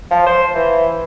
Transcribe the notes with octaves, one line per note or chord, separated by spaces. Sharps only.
F3
C5
E3